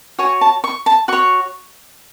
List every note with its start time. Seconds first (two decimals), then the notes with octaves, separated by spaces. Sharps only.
0.19 F#4 C#5 G#5
0.41 A5
0.64 C#6
0.86 A5
1.08 F#4 C#5 C#6